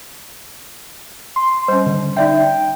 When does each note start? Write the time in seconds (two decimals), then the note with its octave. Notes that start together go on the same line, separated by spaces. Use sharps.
1.36 C6
1.68 G3 C#4 C5
1.87 D3
2.17 D#4 D5 E5 G5